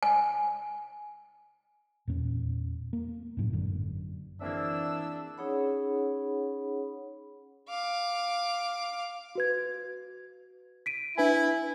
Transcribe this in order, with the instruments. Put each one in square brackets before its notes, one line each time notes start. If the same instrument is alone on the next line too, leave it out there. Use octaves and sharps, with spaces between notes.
[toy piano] G#5
[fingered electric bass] E2 A#2 C4 C#4
A#3
F#2 A2 F#3
G#1 F#2 D3
[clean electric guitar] E3 A#3 C4 [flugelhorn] D4 [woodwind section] G#4 E5 E6
[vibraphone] C#4 D#4 G#4 C#5 F#5 B5
[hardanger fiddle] F5 D6
[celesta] F#4 B4 G#6
B6 D7 D#7
[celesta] D4 B4 G#5 [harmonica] E4